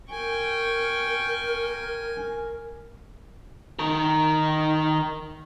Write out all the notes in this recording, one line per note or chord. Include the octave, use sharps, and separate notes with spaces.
A#4 G5 G#5 C#6
D#3 A#4